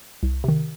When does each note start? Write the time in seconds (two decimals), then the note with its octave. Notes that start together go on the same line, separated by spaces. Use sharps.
0.23 C2
0.44 C3 D#3